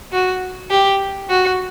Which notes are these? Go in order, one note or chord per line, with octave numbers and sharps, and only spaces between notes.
F#4
G4
F#4